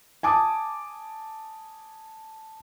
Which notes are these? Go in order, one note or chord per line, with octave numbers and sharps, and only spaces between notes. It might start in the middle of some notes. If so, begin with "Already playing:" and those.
G#5 A5 D6 D#6